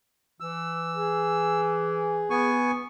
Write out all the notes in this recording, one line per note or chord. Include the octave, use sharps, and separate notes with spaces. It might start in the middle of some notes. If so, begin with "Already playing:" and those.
E3 E6
G#4
B3 G#5 C#6